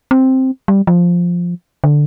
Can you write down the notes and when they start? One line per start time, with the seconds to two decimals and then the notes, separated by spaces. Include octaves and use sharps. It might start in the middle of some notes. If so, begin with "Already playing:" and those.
0.11 C4
0.68 G3
0.87 F3
1.84 D3